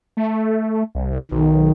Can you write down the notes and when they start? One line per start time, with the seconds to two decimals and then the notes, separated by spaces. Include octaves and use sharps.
0.17 A3
0.95 C2
1.31 B1 D#3